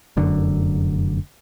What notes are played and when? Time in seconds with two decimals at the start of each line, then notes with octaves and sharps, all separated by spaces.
0.17 F1 F#2 D3